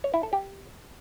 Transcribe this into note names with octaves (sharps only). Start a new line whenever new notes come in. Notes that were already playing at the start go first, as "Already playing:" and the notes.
C#5
E4
A4
G4